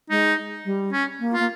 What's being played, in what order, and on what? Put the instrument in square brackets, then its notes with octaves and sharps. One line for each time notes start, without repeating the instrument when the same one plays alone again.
[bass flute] G#3 [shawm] D#4
[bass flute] G3
[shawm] C#4
[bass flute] A#3
[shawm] F4
[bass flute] A#3